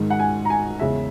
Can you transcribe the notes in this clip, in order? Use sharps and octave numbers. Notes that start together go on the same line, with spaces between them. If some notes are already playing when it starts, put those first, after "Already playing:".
Already playing: G#2 D#3 G#3
F#5
G#5
A#5
G#5
E2 C#3 G#3 C#4 E5